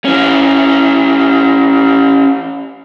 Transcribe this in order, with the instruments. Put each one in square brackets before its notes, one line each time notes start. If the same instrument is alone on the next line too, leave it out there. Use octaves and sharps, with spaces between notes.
[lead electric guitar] E3 C#4